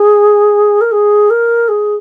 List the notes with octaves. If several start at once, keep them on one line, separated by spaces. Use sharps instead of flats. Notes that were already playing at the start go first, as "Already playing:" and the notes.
Already playing: G#4
A#4
G#4
A#4
G#4